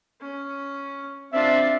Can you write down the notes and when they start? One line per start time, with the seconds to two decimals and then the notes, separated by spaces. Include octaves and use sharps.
0.21 C#4
1.33 C4 D4 F4 E5